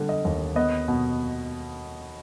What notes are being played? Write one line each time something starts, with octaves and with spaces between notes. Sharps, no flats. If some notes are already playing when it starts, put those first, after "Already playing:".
Already playing: D3 G3
D#5
D#2
B3 D#5
B2